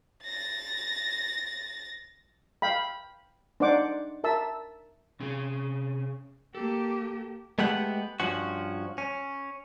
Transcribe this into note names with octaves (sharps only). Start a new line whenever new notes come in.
A6 A#6
F5 G5 B5
D4 D#4 C5 D5 F#5 D6
A#4 E5 A5 E6
C3 C#4 G#4
A#3 G4 A4
G#3 A3 B3 G4 F#5
G2 F3 C#4 F#4
C#4